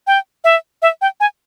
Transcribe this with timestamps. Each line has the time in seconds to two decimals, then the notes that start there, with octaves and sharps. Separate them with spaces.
0.07 G5
0.44 E5
0.82 E5
1.01 G5
1.20 G#5